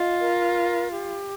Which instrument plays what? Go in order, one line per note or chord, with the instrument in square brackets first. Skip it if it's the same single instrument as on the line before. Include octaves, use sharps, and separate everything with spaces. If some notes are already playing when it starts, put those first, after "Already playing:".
Already playing: [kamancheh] F4 [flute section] D#5
[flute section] A#4
G4